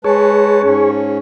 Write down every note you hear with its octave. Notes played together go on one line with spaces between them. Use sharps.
G#3 G#4 B4 C#5 A5
G#2 C#4